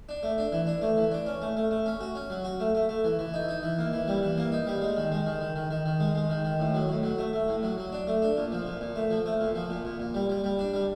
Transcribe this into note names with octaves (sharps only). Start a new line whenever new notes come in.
D4
A3
D4
E3
D4
A3
E3
D4
C#4
A3
A3
A3
C#4
F#4
C#4
F#3
F#4
A3
A3
A3
E3
E3
D#4
D#4
E3
A#3
E3
G3
E3
A#3
D#4
G3
G#3
D#3
G#3
D#3
D#3
D#3
D#3
D#3
G#3
G#3
D#3
D#3
A2
F#3
A2
F#3
A3
A3
A2
F#3
F#3
D4
A3
D4
A#2
F3
A#2
A#2
A3
F3
A3
A#2
F3
A#2
A#2
A#2
G3
G3
G3
D4
G3